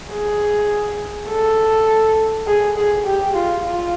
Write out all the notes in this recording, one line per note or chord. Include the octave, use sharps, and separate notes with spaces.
G#4
A4
G#4
G#4
G4
F4
F4